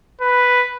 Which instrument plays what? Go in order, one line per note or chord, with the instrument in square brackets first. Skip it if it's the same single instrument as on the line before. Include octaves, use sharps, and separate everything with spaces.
[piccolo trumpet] B4